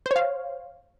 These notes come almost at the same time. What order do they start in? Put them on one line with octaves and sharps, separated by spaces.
C5 C#5 F5